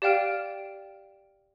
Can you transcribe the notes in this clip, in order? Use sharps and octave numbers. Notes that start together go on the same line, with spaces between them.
G4 D5 F5 G5 F6 D7